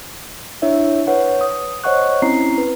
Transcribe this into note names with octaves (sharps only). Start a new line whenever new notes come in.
D4 E4 C#5 E5
B4 C#5 F#5
D#6
C5 C#5 D#5 F#5 C#6 F#6
C4 C#4 E4 A#5 C7
B4